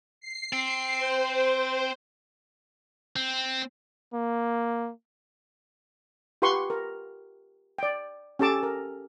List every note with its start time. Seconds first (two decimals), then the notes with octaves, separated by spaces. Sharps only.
0.21 C7
0.53 C4
0.97 C5
3.16 C4
4.14 A#3
6.42 F4 G4 B4 F#5 C6 C#6
6.70 A#4
7.78 D5 G5
8.39 C#4 G4 A4 A5 D6
8.63 A#4